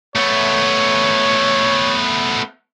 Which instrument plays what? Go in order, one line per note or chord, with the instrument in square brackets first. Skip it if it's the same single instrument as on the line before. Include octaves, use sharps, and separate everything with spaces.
[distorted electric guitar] A3 B3 [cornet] C#5